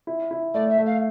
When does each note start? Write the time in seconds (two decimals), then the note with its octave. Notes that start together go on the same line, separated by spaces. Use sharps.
0.07 E4
0.31 E4
0.54 A3 D5
0.70 E5
0.78 A3
0.86 F5